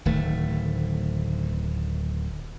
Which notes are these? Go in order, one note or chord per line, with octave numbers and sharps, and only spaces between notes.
D1 D#3 A3